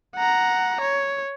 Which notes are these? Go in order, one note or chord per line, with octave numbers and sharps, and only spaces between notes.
F#5 A#5
C#5